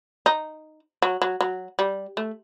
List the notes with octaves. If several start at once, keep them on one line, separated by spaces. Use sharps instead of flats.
D#4
F#3
F#3
F#3
G3
A3